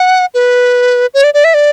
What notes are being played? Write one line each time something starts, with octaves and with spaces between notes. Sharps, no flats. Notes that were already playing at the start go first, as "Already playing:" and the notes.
Already playing: F#5
B4
C#5
D5
D5
E5
D5